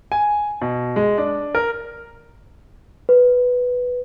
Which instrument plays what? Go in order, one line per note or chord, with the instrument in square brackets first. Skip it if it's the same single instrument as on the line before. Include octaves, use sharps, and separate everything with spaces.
[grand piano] G#5
B2
G#3
D4
A#4
[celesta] B4